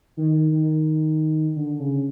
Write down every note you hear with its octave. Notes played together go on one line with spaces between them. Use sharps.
D#3
D#3
D3
C#3